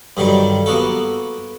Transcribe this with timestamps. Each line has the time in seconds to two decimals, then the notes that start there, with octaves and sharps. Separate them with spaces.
0.17 G2 D3 D#3 F#3 G3
0.66 A#3 B3 F#4 A4